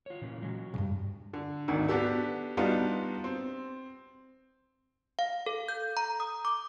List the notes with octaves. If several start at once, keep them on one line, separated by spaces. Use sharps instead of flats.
F4 C#5
A#2 C#3 E3
F#3 G#3 C#4
B1 G2
D3
G#1 D2 D#3
B3 D4 F#4 G4 A4
G3 B3 D4 D#4 F4 F#4
C4
F5
A4
G6
A#5
D#6
D6